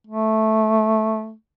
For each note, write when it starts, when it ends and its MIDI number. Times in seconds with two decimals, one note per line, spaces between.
0.07 1.33 57